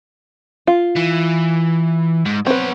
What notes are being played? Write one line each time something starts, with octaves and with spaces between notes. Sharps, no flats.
F4
E3
G#2
B3 C4 B4 C#5